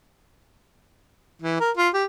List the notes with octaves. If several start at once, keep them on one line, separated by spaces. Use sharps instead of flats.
E3
A#4
F4
G4